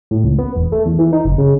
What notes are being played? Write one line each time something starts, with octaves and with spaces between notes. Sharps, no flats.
A2
C#2
B3
E1
A3
E2
E3
D#4
F#1
C#3